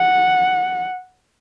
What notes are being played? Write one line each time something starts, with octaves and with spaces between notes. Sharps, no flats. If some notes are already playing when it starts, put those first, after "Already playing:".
Already playing: F#5